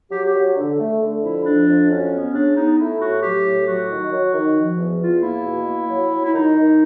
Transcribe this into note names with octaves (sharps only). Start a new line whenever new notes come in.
F#3 G4
G4
F#3
D3
A3
D3
F2 E4
F3 D4
F2
F#3 C#4
B3
C#3 D4
B3 D#4
A3 E4
A2 F#4
F#3 G4
A2
F#3 F#4
D#3
F#3
D#3
F3
E2
E2 F4
A#3 E4
B2
A#3
F#3
F#3
E4
D#3 D#4
D#3